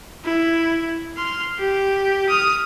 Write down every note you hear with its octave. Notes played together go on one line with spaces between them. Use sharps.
E4
C6 F6
G4
D#6 F6